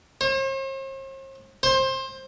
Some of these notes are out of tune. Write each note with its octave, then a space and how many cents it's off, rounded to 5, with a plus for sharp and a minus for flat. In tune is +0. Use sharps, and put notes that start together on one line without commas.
C5 +45
C5 +20